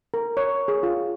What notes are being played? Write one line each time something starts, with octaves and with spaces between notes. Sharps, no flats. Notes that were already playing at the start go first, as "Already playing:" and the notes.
A#4
C#5
G#4
F4